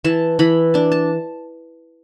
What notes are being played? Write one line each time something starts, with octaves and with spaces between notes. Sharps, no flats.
E3 A5
E3 B5
D4 A5
A5